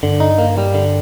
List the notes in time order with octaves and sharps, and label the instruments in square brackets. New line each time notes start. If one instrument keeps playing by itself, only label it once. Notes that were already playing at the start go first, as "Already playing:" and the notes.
[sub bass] G2 [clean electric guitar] D3
[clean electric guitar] D#4
A#3
G3
D3